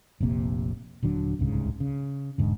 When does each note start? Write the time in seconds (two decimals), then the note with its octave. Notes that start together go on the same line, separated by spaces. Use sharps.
0.20 F1 A#1 C3 A#3
1.02 D#1 D3 F#3 D4
1.39 D1 C2 G#2 C#3
1.80 C#3
2.38 E1 G#2 D3